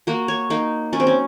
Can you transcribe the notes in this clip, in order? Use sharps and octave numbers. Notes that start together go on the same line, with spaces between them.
A#3 F#4
C#5
A#3 D#4
F#3 C#4
C4
C#4